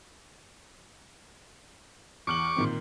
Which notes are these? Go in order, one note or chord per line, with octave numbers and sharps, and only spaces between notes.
E2 C#6 D6 F6 F#7
A#2 D#3 C4